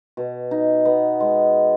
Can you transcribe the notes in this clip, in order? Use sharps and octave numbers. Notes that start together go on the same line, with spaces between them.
B2
D#4
B3
G#3